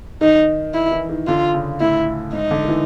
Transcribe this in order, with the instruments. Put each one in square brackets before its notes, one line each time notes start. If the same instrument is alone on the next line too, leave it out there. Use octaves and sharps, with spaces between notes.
[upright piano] D#3 [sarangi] D#4
[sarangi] E4
[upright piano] E3
D#3
[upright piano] D3 [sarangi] F4
[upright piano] C#3
[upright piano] A2 [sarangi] E4
[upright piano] G#2 [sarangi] D#4
[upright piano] D3
D#3
E3